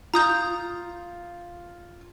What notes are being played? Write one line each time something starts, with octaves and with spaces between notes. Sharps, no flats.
F4 A#5 D#6 G6